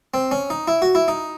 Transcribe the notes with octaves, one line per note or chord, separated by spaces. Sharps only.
C4
C#4
D#4
E4
F#4
E4
D#4